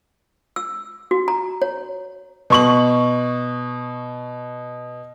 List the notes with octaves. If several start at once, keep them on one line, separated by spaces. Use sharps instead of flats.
E6
F#4
A#5
C#5
B2 C#6 F#7